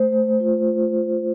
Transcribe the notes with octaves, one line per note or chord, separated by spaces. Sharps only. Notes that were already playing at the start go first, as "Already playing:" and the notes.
Already playing: A3 C5
A3
F4
F4
A3